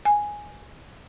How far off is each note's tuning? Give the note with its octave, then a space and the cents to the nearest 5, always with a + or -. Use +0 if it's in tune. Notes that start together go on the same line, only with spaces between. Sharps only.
G#5 +0